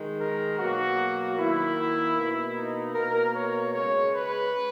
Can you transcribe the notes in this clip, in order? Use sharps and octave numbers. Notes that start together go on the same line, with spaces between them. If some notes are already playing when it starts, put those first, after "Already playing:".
Already playing: D#3 G#3
A#4
B2 F#3 A#3 F#4
D#3 A#3 E4
B2 A#3
D#4
B2 A#3 A#4
C#5
C#3 G#3 C#5
B4